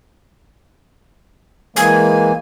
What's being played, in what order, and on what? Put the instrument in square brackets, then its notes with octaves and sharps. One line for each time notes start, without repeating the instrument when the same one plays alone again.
[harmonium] E3 G#3 A#3 [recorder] G#5